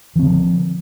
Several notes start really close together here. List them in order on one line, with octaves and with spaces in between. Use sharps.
E3 C4 D3 F3